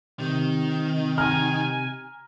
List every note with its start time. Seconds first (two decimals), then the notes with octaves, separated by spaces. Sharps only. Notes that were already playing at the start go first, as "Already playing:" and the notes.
0.19 C3 D#3
1.18 G#5 A#5 F6